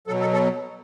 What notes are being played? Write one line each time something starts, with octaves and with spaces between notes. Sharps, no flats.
B2 F#3 A4
A4
A4